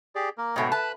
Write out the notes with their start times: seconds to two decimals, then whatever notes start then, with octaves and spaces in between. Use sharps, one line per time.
0.15 G4 G#4 D5
0.38 A#3 A#4
0.56 G#2 B2 A3 C#5 D#5 G5
0.72 B4 A5 B5 F#6